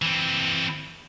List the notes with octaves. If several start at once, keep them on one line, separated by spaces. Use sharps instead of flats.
E3 C4